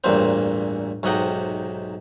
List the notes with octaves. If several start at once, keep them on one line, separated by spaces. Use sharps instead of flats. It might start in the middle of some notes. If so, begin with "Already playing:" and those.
A1 E2 G2 A#2 C4 C5
B1 G#2 C3 D#5 F#5 G5